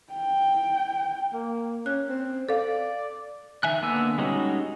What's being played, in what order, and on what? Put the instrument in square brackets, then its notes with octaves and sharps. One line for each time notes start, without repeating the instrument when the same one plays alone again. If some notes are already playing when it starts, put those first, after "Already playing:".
[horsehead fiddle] G5
[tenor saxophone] A#3
[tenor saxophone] C#4 [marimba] F#6
[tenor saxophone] C4
[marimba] A4 F5 [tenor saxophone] D5
[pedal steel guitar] D#3 E5 G#5 F#6
D3 A#3 B3 G#5 E6
G3 G#3 C#4 D#4 F#4